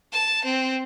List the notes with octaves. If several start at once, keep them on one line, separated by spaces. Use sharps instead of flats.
A5
C4